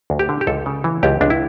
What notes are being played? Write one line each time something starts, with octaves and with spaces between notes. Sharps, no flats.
D2
G4
D3
G4
C#2 A4
C#3
E3
C#2 G4
C#2 D4
E4